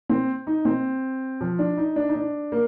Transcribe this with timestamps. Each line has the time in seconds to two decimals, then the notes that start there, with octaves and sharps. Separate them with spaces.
0.09 C4
0.47 D#4
0.65 C4
1.41 F3
1.59 D4
1.77 D#4
1.96 D4
2.09 D#4
2.15 D4
2.52 A#3